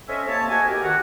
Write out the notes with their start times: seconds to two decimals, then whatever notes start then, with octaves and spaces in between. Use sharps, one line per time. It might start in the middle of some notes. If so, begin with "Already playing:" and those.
0.07 C4 C#4 A4 D#5 E5
0.27 C3 A#3 C#5 A5
0.48 G#2 F#4 A4 D#5 G#5
0.67 G4 A#4
0.82 D#3 F#4